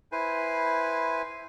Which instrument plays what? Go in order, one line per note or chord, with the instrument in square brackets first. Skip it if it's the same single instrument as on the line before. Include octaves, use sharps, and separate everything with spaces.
[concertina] E4 B4 C5 G#5